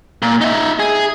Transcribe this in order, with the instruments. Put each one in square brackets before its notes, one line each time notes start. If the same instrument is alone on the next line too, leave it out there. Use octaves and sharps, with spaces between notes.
[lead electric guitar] A#2
D#4 E5
G#4